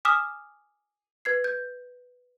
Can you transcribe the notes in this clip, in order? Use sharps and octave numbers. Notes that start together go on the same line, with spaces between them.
G#5 D6 D#6 F6 B6 E7
B4 G#6 C7
G6